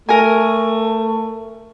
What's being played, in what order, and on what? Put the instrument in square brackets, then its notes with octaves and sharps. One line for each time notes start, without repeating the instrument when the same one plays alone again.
[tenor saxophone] A3 [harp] A#4 G#5